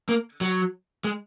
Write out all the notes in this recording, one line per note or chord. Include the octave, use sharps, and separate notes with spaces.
A#3
F#3
G#3